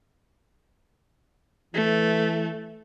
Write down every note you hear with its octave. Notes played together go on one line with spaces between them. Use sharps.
E3 A3